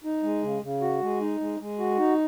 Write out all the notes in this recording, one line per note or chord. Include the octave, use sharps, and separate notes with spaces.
D#4
G#3
C#3
C#3
F#4
G#3
D#4
G#3
G#3
F#4
D#4